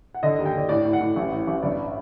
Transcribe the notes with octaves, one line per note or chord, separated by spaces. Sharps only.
F#5
D3 D#5
D#2
G5
D3 D5
A2 D5
A2
F#5
A2
A1
A2
A1
G1 D5